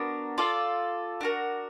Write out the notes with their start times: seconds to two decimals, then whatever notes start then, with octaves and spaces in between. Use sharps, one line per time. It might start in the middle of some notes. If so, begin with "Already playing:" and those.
Already playing: B3 D4 F#4 A#4
0.38 F4 A4 D5 F5
1.21 D4 F#4 A#4